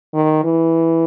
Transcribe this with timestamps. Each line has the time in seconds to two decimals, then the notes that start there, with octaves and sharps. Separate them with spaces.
0.14 D#3
0.44 E3